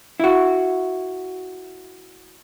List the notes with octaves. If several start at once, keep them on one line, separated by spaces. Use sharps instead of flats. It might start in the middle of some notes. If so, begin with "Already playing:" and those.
E4 F#4